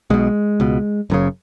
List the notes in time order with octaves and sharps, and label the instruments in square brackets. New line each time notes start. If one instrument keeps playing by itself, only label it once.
[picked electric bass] B1 B2 G#3
C#2 B2
F#1 F#2 C#3